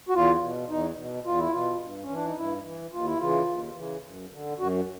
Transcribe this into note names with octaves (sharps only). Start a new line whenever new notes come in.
F#4
E2 F4
B2
E2 D#4
B2
E2 F4
E4
B2 F4
G2
C#4
E3 D4
D#4
G2 E4
E3
D#2 F4
E4
C#3 E3 F4
D#2
C#3 E3
F#2
D3
F#2 F#4